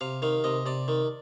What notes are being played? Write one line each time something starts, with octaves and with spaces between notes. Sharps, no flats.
C3 F5
D#3 F5
C3 D#5
C3 D5
D#3